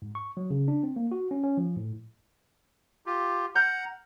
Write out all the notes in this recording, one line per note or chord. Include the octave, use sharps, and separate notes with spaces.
G#2
C#6
F#3
C#3
D4
C4
A#3
F#4
C#4
C#4
F3
A2
F4 G4
F#5 A#5 F6 G6